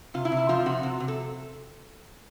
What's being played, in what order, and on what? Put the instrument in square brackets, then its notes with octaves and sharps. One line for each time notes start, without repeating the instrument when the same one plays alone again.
[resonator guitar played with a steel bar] C3 F4
E4
C3
E4
F3 F4
C3 F#4
C3
C3
A4